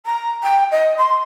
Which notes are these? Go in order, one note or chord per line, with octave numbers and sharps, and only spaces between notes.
A#5
G5
D#5
C6